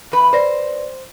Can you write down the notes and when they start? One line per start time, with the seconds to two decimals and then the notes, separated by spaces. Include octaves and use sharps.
0.12 E2 B4
0.33 B4 C5 D5 A#6